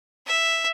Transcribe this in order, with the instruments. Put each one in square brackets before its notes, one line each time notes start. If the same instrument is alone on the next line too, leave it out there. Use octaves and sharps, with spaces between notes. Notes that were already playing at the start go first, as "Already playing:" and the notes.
[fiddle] E5